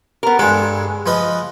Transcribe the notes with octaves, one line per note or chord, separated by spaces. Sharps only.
B3 A#4
G2 G#3 A4
F3 B4 D#5